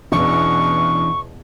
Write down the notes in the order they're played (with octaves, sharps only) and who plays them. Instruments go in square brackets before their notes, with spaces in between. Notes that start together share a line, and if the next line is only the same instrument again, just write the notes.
[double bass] E2 B2 [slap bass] E3 C#4 D4 [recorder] C#6